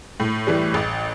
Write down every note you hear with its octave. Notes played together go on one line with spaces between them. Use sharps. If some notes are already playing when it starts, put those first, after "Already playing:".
A2
E3 G3
A1